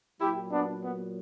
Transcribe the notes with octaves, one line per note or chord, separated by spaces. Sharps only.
A#2 F#3 E4 G4
B3 D4
B3